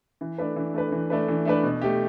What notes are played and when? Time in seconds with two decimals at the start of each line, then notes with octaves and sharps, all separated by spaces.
0.21 E3
0.38 A3 D4 B4
0.56 E3
0.74 A3 D4 B4
0.92 E3
1.10 A3 D4 B4
1.28 E3
1.45 A3 D4 B4
1.63 B2
1.82 A3 G4